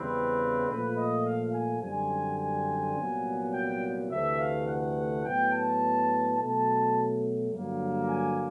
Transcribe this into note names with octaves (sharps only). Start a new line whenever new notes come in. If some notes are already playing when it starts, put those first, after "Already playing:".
Already playing: E2 C#3 E3 G3 C4 B4
A#2 F3 A3 B4
D#5
F5
G#5
F#2 D3 G3 C4 G#5
G#5
C2 A#2 F#3 B3
G5
D2 C3 E3 A3 E5
F5
F#5
A2 F#3 B3 G5
A5
B2 F#3 A3 A5
G2 D3 F#3 A#3
G#5